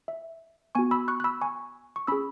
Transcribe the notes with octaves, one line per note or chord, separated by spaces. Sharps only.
E5
B3 F#4 G#5 C#6
B5 E6
C#6 F#6
F#6
B5 E6
G#5 C#6
C#6
C#4 G#4 B5 E6